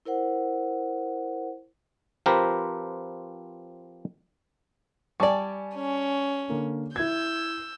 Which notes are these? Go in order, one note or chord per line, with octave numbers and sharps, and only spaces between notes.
E4 A#4 C5 F#5
F3 C4 G4 A#4 B4
G3 D5 G#5 A5 C#6
C#4
D3 A#3
E4 E6 G6 G#6